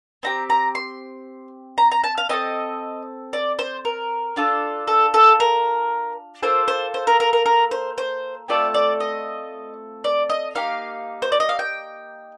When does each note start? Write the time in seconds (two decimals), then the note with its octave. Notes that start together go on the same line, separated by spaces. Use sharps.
0.23 C4 D#4 G4 A#5
0.50 A#5
0.75 C6
1.78 A#5
1.91 A#5
2.04 A5
2.18 F5
2.29 C4 F4 A4 D#5
3.33 D5
3.59 C5
3.85 A#4
4.36 D4 F4 A4
4.87 A4
5.14 A4
5.40 A#4
6.42 A#3 F4 A4 C5
6.68 C5
6.94 C5
7.07 A#4
7.20 A#4
7.33 A#4
7.46 A#4
7.71 C5
7.98 C5
8.48 A3 C4 F4 A4 D5
8.74 D5
9.00 D#5
10.04 D5
10.30 D#5
10.55 A#3 D#4 G4 F5
11.22 C5
11.32 D5
11.40 D#5
11.49 F5
11.59 G5